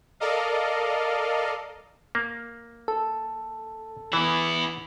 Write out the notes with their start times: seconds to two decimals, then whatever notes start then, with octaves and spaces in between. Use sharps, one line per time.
0.20 A4 A#4 D5 D#5 F5
2.15 A#3
2.88 A4
4.13 E3 B3 E4